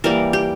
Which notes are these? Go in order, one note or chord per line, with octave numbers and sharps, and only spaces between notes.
E3 G3 A#3 A#4
G4